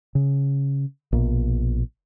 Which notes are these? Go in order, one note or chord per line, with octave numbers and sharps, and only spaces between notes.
C#3
A#1 B2